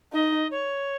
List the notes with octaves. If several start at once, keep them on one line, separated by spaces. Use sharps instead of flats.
D#4 D#5
C#5